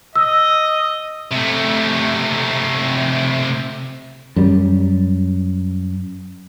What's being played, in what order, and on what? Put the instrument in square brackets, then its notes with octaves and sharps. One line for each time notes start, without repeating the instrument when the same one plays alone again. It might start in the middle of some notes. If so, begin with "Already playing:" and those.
[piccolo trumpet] D#5 [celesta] E6
[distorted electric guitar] C3 A3
[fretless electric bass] F#2 G3